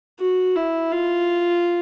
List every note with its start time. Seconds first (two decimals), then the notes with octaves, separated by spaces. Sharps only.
0.20 F#4
0.56 E4
0.92 F4